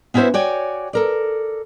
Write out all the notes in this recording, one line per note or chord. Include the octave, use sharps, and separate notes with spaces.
B3 C#4 E4 F#4 C5 E5
F#4 C#5 D5 G5 G#5
A4 A#4 D5